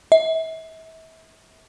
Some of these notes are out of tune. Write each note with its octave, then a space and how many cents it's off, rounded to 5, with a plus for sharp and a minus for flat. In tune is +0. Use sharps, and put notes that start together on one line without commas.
E5 -35